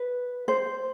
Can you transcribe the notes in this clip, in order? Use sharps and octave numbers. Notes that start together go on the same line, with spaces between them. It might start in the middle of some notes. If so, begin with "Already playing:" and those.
Already playing: B4
C5